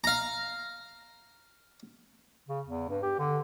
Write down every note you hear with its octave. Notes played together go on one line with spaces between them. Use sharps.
F5 A#5
C#3
E2
G2
G4
D3